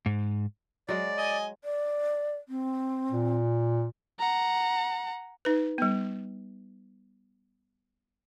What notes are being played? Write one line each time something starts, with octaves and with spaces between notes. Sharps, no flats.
G#2
F#3 G#3 D5
D#5 G#5
D5
C4
A#2
F#5 A#5
D#4 B4
G3 B3